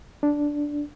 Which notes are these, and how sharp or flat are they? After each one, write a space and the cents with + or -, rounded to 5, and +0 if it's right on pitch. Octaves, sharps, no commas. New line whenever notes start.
D4 -5